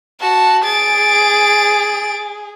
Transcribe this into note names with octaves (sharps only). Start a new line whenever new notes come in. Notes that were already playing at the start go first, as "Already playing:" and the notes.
F#4 A5
G#4 A6 D7